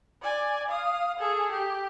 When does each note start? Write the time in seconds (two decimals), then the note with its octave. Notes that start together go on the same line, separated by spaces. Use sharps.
0.22 D5 G#5
0.68 F5 D#6
1.19 G#4 A4
1.52 G4